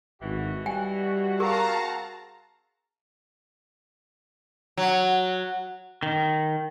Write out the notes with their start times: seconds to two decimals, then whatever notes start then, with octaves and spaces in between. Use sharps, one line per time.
0.22 G#1 B2 E3 F#4
0.66 G3 G5 G#5
1.40 C4 F#4 G#4 A#4 F5 A5 A#5 C#6
4.77 F#3
6.03 D#3